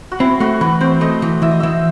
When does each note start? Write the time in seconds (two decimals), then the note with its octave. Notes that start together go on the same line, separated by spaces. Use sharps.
0.12 F#4
0.20 C4 E4
0.40 A3 F#4
0.61 E3 B4
0.81 C4 C5
1.01 A3 D#5
1.22 E3
1.42 E3 E5
1.51 D#5
1.60 E3 E5